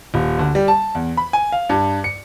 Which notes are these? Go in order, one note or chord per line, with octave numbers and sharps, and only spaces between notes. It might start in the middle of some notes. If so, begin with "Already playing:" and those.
D#1
D2
G3
A5
E2
B5
G#5
F5
G2
C#7